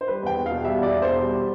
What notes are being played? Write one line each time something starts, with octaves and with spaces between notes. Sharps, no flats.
C5
G3 B4
E2 G5
E2
B2 F5
G3 E5
E2 D5
E2
B2 C5
G3